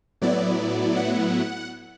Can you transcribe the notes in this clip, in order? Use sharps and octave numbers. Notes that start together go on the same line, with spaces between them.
A2 F#3 B3 E4 D5
F#5